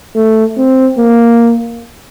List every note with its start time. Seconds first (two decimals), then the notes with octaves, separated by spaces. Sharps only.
0.16 A3
0.58 C4
0.98 A#3